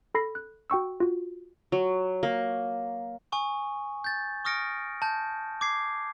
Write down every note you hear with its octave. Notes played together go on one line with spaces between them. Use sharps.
A4 B5 A#6 C7
F#6
F#4 G5 C#6 E6
F4 F#4
F#3
A#3
G#5 C#6 D#6
G6 A6
C#6 D#6 F6 A#6 C#7 D7
A5 G6
D6 G#6 C7